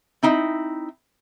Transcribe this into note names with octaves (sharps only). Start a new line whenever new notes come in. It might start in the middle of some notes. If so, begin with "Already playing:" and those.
C4 D#4 E4